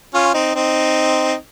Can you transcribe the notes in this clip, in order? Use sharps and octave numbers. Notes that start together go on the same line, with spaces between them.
C#4 F4
C4 D#4
C4 D#4